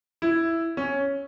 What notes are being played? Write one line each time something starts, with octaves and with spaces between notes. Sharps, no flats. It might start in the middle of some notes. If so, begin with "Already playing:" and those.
E4
C#4